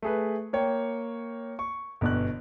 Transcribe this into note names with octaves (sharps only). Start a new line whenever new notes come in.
A3 G#4 B4
A#3 C#5 G5
C#6
G1 B2 F#6